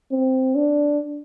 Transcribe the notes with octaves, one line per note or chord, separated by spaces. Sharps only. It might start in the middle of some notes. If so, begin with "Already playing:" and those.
C4
D4